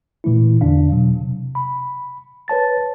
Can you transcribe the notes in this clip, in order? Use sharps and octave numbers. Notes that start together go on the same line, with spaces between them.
A#2 E3 A3 E4
E2 D3 D4 F5
B2 F#3
C3
B5
B4 C#5 A5 A6